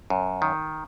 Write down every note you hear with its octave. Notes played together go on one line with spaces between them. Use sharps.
F#2
D#3